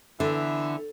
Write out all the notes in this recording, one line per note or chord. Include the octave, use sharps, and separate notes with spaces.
D3 E3 B3 E5